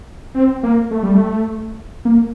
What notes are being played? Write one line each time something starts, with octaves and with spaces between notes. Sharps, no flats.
C4
A#3
A3
G3
A3
A#3